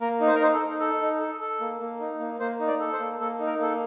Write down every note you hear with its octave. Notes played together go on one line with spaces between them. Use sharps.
A#3 A#4
D#4
C5
A#4
D#4 C5
A4
D#4
A4
D#4
A4
A4
A#3
A#3
D#4
A#3
A#3 C5
D#4
D5
A4
C5
A#3
A#3 A4
D#4
A#4
A#3 A4